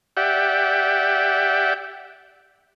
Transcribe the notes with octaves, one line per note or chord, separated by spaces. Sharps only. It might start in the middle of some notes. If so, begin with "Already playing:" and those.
G4 D5 E5 F#5 G5